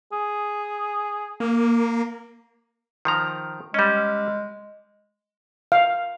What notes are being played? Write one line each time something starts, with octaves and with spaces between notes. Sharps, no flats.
G#4
A#3
D#3 F3 A#5
G3 G#3 C#4
F5